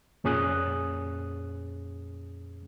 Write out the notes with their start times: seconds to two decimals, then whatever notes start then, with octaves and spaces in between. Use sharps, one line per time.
0.24 F2 A#2 C#4 G#4 D#6 F#6